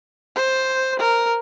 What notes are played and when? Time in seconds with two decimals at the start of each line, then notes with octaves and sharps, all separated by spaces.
0.36 C5
1.00 A#4